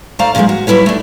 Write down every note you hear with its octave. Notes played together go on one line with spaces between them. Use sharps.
A3 C5 D5 F5 A#5
A#2 D3 E3 F3 G#3
F#4
F#3 G3 E4 B4 C#5
A3 D4